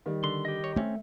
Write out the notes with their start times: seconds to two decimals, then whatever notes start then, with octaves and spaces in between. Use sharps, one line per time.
0.06 D#3 G3
0.24 D3 C6
0.45 G4 D#5
0.64 C#5
0.76 A3 C4 C#4